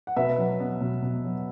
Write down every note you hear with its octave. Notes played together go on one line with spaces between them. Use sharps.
F#5
B2 B4 E5
F#3
B3
B2
B2
F#3